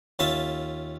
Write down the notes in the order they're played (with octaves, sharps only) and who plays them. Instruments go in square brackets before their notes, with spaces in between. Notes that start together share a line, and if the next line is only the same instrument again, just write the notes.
[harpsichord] D#2 C#4 F4 E5 A5